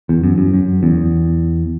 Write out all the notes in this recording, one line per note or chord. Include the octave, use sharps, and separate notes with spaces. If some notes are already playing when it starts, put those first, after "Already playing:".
E2
F#2
F#2
F#2
E2